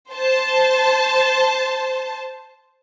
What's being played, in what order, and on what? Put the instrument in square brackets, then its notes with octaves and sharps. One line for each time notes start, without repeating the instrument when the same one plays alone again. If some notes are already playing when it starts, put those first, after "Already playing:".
[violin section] C5 A5